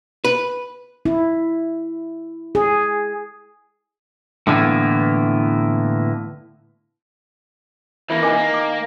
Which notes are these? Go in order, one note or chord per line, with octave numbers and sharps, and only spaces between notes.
B4
E4
G#4
A2 D3 E3 A#3 B3
E3 A#3 E4
D#3 G#5 D6
A#3
D6